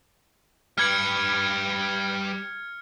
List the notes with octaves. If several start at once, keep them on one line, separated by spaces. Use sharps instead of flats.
G3 B4 F6 G#6 C#7